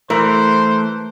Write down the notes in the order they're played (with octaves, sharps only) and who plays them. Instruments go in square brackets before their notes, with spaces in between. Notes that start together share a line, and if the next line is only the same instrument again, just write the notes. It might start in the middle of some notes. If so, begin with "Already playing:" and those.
[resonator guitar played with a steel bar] E3 [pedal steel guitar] A3 [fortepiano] A#4 [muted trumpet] C5